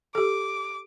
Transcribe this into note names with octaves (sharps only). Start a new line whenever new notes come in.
G4 A4 D6